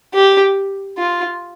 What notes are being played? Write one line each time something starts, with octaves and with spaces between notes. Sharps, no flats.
G4
F4